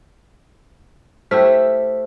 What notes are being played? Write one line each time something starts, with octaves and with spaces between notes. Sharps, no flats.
A3 E4 G4 C5 F6 B6